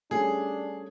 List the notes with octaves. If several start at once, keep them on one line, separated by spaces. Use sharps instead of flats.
G3 A3 C#4 D4 G#4